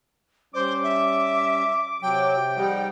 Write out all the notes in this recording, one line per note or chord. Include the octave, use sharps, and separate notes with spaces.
G3 C#4 C5 D6
E5
C3 F#3 G5
G#2 F3 G3 D#4 F#5